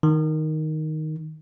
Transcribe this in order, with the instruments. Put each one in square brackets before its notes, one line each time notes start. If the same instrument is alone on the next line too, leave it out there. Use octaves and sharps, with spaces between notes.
[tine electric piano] D#3